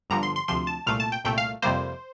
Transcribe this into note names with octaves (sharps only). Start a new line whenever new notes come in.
G1 G2 D3 F3 A#5
C6
C6
D2 C3 F3 C6
A5
C2 A#2 A3 F5
A5
G5
C2 A#2 A3 G5
F5
F2 C3 G3 A#3 C5